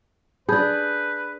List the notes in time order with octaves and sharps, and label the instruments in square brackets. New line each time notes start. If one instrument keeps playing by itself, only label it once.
[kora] D4 G#4 [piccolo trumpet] B4 [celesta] A5 B5 G6